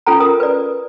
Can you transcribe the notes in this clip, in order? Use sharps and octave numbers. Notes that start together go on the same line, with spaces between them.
C#4 F4 A4 G5 A#5
A#4 D#6
B4 D5